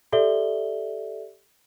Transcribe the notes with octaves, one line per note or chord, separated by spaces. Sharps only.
G4 A4 D5 E5 G7